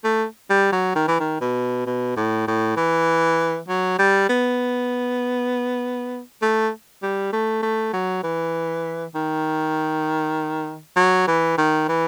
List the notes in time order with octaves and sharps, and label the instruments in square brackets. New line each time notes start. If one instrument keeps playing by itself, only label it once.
[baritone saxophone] A3
G3
F#3
D#3
E3
D#3
B2
B2
A2
A2
E3
F#3
G3
B3
A3
G3
A3
A3
F#3
E3
D#3
F#3
E3
D#3
E3